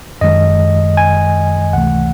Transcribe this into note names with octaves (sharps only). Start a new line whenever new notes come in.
F#2 D#3 G#3 D#5
G#5
C#2 C3 E3 A3 F#5